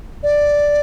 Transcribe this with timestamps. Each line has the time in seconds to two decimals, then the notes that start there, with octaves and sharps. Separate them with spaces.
0.23 D5